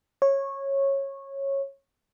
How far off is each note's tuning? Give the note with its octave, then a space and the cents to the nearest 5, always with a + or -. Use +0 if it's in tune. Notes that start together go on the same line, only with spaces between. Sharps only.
C#5 -15